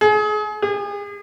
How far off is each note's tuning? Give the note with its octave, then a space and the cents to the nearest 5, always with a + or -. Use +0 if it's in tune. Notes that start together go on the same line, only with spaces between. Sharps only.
G#4 +30
G#4 -40